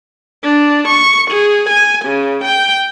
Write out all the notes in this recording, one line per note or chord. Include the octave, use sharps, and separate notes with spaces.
D4
C#6
G#4
G#5
C#3
G5